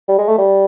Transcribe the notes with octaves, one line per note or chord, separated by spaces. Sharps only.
G3
G#3
A3
G3